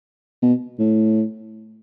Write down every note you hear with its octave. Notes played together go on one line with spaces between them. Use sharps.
B2
A2